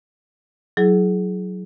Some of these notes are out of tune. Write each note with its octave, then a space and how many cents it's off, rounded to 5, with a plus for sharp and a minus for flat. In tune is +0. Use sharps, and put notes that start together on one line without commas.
F#3 +0 E4 +0 G#4 +20